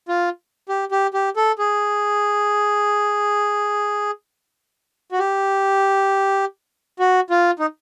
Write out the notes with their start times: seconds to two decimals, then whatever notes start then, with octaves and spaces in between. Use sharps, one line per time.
0.08 F4
0.69 G4
0.91 G4
1.14 G4
1.36 A4
1.58 G#4
5.12 F#4
5.19 G4
6.99 F#4
7.30 F4
7.59 D#4